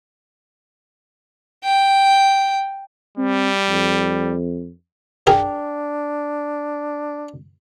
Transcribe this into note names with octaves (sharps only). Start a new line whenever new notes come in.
G5
G3 C4
F2
D4 G#4 A#4 G5